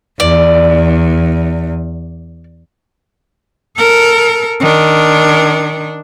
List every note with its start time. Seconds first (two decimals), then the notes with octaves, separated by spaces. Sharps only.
0.20 E2 D5
3.77 A4 A#4
4.61 D#3 D4